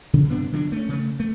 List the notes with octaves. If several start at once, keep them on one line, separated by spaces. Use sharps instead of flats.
C#3
G2 C3 B3 D4
D3 F#3 C#4 D4
A3 C#4
C#3 A3
A3